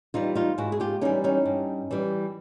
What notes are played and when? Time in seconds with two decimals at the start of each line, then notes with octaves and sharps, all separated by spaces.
0.14 E3 G3 D#4 F4
0.35 D#4 F4
0.58 G#2 E4 F#4
0.72 G#4
0.80 F4 G4
1.01 E3 G3 C#4 D#4
1.24 C#4 D#4
1.45 G2
1.91 E3 G3